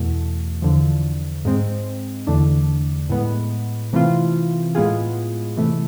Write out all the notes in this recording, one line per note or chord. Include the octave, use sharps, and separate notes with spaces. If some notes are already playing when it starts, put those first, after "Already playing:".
Already playing: E2 B2 A3
E2 D3 F3
G#2 G#3 C4
E2 D3 A3 D4
A2 G#3 B3
C3 E3 A3 C4 F4
A2 G#3 B3 F4 G#4
C3 E3 A3